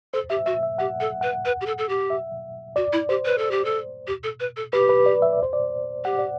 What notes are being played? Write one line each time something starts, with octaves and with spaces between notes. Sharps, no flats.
A4 C5
G4 E5
F#4 E5
E5
G4 F#5
A4 F#5
B4 F#5
B4 F#5
G4
A4
A4
G4
E5
F#4 D5
E4
G4 C5
B4
A4
G4
A4
G4
A4
B4
A4
G4 B4
B4
D5
E5
D5
C5
D5
G4 F#5
D5